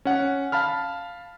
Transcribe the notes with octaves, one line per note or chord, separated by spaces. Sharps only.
C#4 F#5
F5 A5 B5 F6